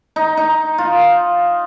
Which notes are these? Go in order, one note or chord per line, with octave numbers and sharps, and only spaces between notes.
D#4
D#4
F4